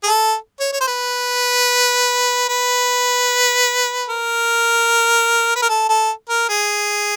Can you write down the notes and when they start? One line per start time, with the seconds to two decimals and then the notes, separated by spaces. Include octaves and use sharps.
0.03 G#4
0.07 A4
0.60 C#5
0.73 C#5
0.81 C5
0.88 B4
2.49 B4
4.09 A#4
5.56 B4
5.62 A#4
5.70 A4
5.89 A4
6.29 A#4
6.49 G#4